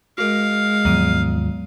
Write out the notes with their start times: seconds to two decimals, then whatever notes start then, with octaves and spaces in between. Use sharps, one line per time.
0.18 G#3 F#4 A#4 F5
0.85 D#2 G#2 F3 F#3 B3 D#7